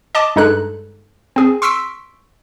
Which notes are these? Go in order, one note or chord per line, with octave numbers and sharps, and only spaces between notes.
D#5 A5 D6
G2 G#3 D#4 A4 F#6
C4 G#4
C6 C#6 E6 B6 C7 D7